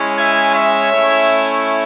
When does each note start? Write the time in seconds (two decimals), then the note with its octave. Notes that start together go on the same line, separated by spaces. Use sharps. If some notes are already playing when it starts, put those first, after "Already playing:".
Already playing: G#3 C#4 E4
0.18 E5 G#5
0.54 C#5 E5
0.91 A3 C#4 E4